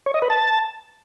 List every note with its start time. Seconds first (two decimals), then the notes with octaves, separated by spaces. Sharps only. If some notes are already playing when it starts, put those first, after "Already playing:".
0.06 C#5
0.14 D#5
0.22 B4
0.30 A5